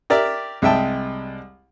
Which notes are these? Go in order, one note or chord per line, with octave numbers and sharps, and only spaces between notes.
G4 A#4 D5 E5
C2 G#3 E5 G5 A5